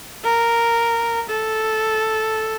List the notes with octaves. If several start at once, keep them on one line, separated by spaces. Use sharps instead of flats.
A#4
A4